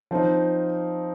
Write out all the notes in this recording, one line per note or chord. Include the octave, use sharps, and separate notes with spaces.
F3 C4 D#4